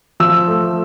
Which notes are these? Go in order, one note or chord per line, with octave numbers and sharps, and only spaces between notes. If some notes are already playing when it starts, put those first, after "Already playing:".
F3 E6
A3